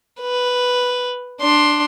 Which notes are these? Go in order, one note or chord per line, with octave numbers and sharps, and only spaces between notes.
B4
D4 C6